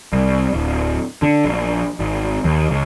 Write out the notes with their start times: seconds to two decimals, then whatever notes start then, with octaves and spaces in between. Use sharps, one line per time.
0.13 C2
0.53 D1
1.22 D3
1.44 A#1
1.99 G#1
2.44 D#2
2.70 C#2